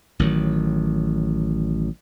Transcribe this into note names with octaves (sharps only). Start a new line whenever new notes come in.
A1 D#3 F#3